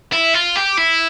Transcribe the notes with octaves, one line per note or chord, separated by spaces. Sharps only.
E4
F4
G4
E4